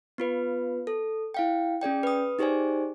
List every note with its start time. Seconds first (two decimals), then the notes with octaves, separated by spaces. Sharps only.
0.18 B3 F4 B4
0.87 A4
1.34 E4 F5 G5
1.81 C#4 G#4 D5 G5
2.03 B4 D#6
2.39 D#4 G4 G#4 C5 D5 G#5